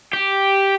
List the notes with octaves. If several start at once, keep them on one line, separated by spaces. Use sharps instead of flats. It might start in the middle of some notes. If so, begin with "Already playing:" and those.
G4